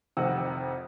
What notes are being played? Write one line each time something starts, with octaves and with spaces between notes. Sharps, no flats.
F1 F2 C3 D#3 F#5 E6